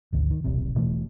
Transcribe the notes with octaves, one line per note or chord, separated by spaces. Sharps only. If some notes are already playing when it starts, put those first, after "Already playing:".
G#1 D2
D#3
D#1 B1 C3
E1 B2 E3 A3